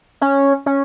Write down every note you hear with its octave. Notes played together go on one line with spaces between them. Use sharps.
C#4
C#4